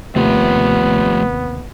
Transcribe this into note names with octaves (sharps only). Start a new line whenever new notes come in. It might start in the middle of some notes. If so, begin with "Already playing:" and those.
D#2 C3 F3 A3 B3 F4 G4